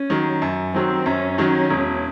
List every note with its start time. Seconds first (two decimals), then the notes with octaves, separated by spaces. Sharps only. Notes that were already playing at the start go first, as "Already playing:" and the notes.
Already playing: C#4
0.10 D#3 F#3
0.42 F#2
0.74 D#3 F#3 C4
1.06 F#2 C#4
1.38 D#3 F#3
1.70 E1